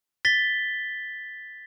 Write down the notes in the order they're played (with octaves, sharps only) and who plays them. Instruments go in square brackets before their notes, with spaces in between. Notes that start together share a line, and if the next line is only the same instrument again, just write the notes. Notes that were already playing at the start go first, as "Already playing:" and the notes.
[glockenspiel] A6 B6 G7